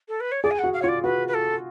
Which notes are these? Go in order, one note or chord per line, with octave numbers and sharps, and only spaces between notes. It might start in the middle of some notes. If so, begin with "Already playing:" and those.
A4
B4
C#5
G#4 D5
G#5
F#4 F#5
F5
F4 C#5
D5
F#4 B4
B4
A4